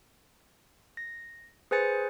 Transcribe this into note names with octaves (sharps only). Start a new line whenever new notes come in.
A#6
G#4 B4 C5 G#5 A6 C#7